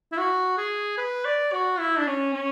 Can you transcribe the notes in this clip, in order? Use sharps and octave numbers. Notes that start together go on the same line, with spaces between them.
E4
F#4
G#4
B4
D5
F#4
E4
D4
C#4
C#4